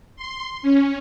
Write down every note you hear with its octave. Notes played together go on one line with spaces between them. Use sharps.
C6
C#4